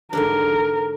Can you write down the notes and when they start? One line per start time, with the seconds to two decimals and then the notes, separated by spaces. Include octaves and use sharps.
0.13 G#2 D3 D4 A#4